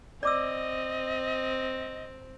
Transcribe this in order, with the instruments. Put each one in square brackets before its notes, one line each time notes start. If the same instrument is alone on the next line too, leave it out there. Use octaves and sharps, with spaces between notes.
[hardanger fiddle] C4 [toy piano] D5 D6 E6 [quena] D#5